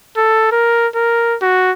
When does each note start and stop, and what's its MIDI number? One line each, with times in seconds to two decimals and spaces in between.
0.17 0.51 69
0.52 0.88 70
0.95 1.36 70
1.42 1.72 66